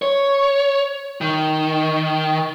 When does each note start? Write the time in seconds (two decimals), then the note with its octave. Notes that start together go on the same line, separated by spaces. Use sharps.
0.02 C#5
1.21 D#3